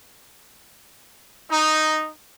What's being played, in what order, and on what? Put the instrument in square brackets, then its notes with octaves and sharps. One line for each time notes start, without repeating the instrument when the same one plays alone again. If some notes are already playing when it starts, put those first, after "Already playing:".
[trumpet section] D#4